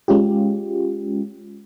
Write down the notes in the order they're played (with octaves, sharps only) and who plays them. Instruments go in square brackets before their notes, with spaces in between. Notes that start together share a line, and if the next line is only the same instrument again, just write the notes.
[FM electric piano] G#3 C#4 F4 G4